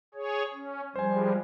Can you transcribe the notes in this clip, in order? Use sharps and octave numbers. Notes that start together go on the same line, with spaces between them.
G#4 C#5
C#4
F3 G3 G#3 C5 G#5